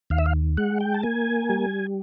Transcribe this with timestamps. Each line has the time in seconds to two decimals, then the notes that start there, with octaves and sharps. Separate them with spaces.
0.10 D#2 F5
0.18 E5
0.26 F5
0.57 G#3 F#5
0.80 G5
0.94 A5
1.03 A#3 G#5
1.50 G3